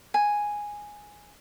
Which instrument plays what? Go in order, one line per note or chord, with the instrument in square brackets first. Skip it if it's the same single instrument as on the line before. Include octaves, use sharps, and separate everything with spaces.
[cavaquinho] G#5